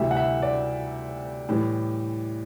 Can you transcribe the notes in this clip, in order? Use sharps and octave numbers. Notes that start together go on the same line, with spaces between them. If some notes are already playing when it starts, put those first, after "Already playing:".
Already playing: D2 C3 E3 G3 E5
F#5
E5
D5
A2 E3 G3